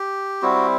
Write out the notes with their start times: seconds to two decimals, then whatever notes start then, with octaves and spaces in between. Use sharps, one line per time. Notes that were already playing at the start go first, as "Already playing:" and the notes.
Already playing: G4
0.42 G3 C4 E4 F#4